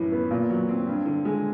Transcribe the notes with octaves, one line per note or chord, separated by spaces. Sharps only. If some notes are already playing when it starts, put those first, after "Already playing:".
Already playing: F#2 A2 E3
B3
A#2
F#3
C4
G2
D3
G#3